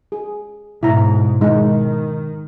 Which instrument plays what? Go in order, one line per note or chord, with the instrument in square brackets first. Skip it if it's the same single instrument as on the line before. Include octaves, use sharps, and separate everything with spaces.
[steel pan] G#4
[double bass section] G#2 [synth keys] B2 [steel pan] E4 A#5
[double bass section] D#3 [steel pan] G#3 D#4